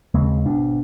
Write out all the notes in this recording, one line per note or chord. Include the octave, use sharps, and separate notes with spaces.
D#2 C#3 G#3 C4
G#1 B2 D4